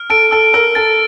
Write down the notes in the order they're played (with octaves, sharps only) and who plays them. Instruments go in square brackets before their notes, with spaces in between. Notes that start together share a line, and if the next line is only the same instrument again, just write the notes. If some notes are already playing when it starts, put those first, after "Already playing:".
Already playing: [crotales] F6
[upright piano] A4 [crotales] D7
[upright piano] A4 [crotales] E6
[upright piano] A#4 [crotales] E6
[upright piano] A4 [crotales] A6